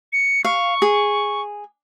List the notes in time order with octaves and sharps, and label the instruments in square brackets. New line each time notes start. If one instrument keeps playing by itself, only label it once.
[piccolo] C#7
[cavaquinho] F5 [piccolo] C#6
[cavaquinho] G#4